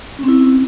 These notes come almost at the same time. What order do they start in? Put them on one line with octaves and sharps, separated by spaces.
C#4 C4 E4